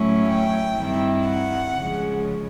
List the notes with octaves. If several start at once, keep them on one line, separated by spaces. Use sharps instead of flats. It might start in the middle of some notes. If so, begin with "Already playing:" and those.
Already playing: A2 F#3 A3 C#4 E4
G5
G2 D#3 G3 C4 E4
F#5
C#3 F3 G#3